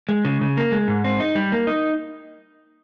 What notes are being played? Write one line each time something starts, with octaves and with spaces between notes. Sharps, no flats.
G#3
C#3
C#3
A#3
G#3
G#2
C4
D#4
G3
A#3
D#4